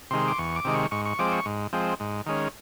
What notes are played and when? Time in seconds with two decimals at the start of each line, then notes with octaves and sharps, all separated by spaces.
0.11 C3 D#3 G#3 C6
0.28 D6
0.38 E2 C#6
0.56 D6
0.65 C3 D#3 G#3
0.74 C#6
0.91 G#2 C#6
1.05 C#6
1.19 F3 G#3 C4 D6
1.32 C#6
1.46 G#2
1.73 F3 G#3 C4
2.00 G#2
2.26 D#3 G#3 C#4